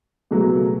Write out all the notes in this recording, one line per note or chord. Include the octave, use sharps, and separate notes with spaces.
C#2 B2 F#3 A3